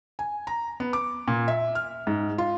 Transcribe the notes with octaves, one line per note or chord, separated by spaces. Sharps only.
G#5
A#5
B3
D6
A#2
E5
F6
G#2
F4